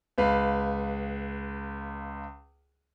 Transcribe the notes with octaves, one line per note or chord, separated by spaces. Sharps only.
C#2 B4 F5